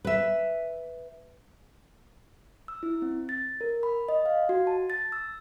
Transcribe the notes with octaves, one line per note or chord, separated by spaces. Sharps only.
B4 E5
E6
E4
C4
A6
A#4
B5
D#5
F5
F#4
A5
A6
E6